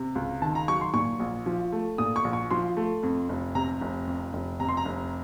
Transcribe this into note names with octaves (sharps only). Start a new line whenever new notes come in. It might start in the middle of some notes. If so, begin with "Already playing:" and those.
Already playing: C3
C#2
D#3 A5
A#5
F#3 C#6
C6
A#2 C#6
A#1
F3
A3
A#2 D#6
C#6
A#1
C#6
F3 C6
A3
F2
F1
C3 A#5
F1
F2
F1
C3 A#5
C6
A#5
F1